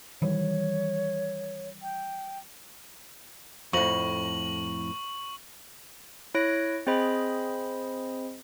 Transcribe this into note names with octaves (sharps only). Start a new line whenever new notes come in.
D#3 E3 G3 C#5
G5
F2 A2 C#6 F#7
E4 C#5 F#6 A#6 D7
C4 G#4 C5 D#5 B5